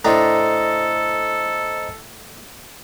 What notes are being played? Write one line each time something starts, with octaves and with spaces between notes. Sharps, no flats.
A2 D4 A4 C5 D#5 A#5